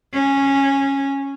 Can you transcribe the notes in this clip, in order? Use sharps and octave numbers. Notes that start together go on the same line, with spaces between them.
C#4